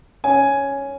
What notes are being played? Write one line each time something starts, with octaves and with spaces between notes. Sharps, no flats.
C#4 G#5